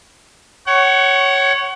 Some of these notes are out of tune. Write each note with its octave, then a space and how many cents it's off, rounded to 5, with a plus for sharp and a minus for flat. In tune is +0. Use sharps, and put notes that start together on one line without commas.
C#5 +0 F#5 +30